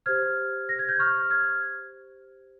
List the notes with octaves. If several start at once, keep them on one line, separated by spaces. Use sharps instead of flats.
G4 C5 F6 G#6
A#6
G#6
G6
C#6 F6
F6 G#6